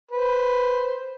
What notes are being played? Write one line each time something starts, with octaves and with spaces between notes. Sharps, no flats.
B4 C5